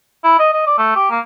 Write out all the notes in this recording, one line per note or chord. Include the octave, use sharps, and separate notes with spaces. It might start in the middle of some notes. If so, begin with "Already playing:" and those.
E4
D#5
D#5
D5
A3
G4
A#3